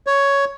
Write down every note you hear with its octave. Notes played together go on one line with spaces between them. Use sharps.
C#5